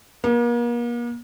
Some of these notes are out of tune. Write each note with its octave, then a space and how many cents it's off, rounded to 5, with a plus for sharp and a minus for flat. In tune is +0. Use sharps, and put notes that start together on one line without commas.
A#3 +40